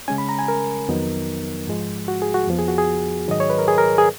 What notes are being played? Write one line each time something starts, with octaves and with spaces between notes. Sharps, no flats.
C#3 G#3 C#4 G#5
B5
A#5
G#5
A#4
F2 D#3 F#3 B3 D#4
G#2 F3 G#3
F#4
G#4
F#4
F2 F3 B3
G#4
F#4
G#4
G#2 D#3 F#3 D#5
C#5
B4
A#4
G#4
A#4
G#4